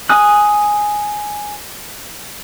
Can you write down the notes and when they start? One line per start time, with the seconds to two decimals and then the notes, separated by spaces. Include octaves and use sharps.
0.09 G#5 D#6 F#6